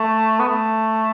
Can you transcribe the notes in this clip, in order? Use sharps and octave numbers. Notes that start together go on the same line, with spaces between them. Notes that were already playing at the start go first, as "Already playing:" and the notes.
Already playing: A3
B3
A3